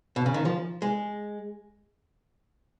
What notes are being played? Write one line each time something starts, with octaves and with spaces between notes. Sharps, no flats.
B2
C#3
D#3
F3
G#3